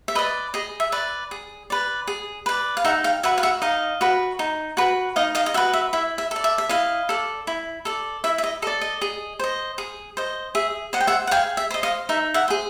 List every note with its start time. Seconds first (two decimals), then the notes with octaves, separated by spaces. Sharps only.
0.08 E5
0.15 B4 D5 D#5
0.54 G#4 D#5
0.80 E5
0.92 B4 D5
1.31 G#4
1.70 B4 D5
2.07 G#4
2.46 B4 D5
2.77 F5
2.84 D#4 E5 F#5
3.04 F5 G5
3.23 F#4 B4 E5 F#5
3.38 F5
3.43 E5 F#5
3.62 D#4 D#5 F5
4.01 F#4 B4
4.39 D#4
4.77 F#4 B4
5.16 D#4 D#5 F5
5.35 D#5 F5
5.46 D#5
5.54 F#4 B4 E5
5.73 E5
5.93 E4 E5
6.18 E5
6.31 A4 D5
6.44 E5
6.58 E5
6.69 E4 D#5 F5
7.09 A4 D5
7.47 E4
7.85 A4 D5
8.24 E4 E5
8.38 E5
8.44 D#5
8.62 A4 D#5
8.67 D5
8.81 D#5
9.01 G#4
9.39 C5 D#5
9.78 G#4
10.17 C5 D#5
10.55 G#4 E5
10.93 C5 D#5 F#5
11.01 G5
11.07 E5 F#5
11.27 F#5
11.31 G#4 F5 G5
11.57 E5
11.70 C5 D#5
11.83 D#5 F5
12.09 D#4 E5
12.34 E5 F#5
12.48 G#4 C5